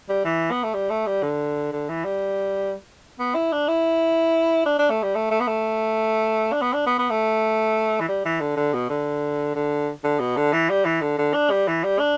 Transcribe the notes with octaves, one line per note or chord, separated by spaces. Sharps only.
G3
E3
B3
A3
G3
A3
G3
D3
D3
E3
G3
B3
E4
D4
E4
D4
D4
A3
G3
A3
A3
B3
A3
D4
B3
D4
B3
B3
A3
E3
G3
E3
D3
D3
B2
D3
D3
D3
B2
D3
E3
G3
E3
D3
D3
D4
G3
E3
G3
D4